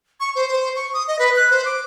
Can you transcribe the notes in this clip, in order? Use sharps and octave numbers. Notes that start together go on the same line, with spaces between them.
C#6
C5
C5
C#6
D#6
D#5
B4
F#6
C5
D6